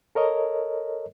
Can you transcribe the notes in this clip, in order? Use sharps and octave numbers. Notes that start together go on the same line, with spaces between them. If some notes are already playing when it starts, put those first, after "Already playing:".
A4 A#4 C#5 D#5